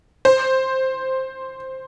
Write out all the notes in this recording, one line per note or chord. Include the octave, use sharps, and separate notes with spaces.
C5